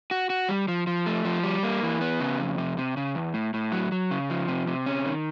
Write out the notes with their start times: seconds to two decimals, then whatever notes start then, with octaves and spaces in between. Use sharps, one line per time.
0.11 F#4
0.30 F#4
0.49 G3
0.68 F3
0.87 F3
1.06 A3
1.25 F3
1.44 G3
1.63 A#3
1.83 E3
2.01 B3
2.20 C#3
2.39 F2
2.58 C3
2.77 C3
2.97 C#3
3.15 E2
3.34 A2
3.54 A2
3.72 F#3
3.92 F#3
4.11 C#3
4.30 F3
4.48 C3
4.67 C3
4.86 C#4
5.05 D#3